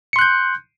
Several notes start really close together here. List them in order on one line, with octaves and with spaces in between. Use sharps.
C#7 C6 F#6 G6